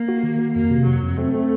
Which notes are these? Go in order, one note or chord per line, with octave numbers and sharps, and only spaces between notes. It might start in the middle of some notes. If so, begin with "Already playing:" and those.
Already playing: A#3
F#4
D#3
F#4
F2 A#3
C3
F2 F#3
F2
A3 C4
C4